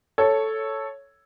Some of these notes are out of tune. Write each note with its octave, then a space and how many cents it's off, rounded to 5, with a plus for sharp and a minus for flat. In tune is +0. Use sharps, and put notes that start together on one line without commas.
A4 +0 C#5 +0